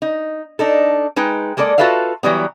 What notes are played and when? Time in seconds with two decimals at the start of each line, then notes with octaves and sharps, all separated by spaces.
0.02 D#4
0.59 D4 D#4 A4
1.16 G#3 D#4 B4 G5
1.57 G#3 A#3 A4 C5 D5
1.78 F4 F#4 A4 B4 E5 F5
2.23 E3 F#3 G3 B3